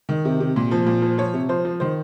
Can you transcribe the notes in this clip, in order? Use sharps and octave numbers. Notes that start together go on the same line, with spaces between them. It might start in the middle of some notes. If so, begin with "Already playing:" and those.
D#3
C3
C3
A#2
F3
A#2
F3
F3 C#5
C3
F3 C5
F3
D#3 C5